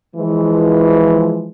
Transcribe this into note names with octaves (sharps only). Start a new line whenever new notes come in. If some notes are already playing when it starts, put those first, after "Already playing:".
E3 F3 G#3